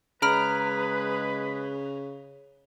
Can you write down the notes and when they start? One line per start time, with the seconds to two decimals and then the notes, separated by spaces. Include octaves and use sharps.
0.22 C#3 G#3 G#4 B4 A#5 B5 F6 D7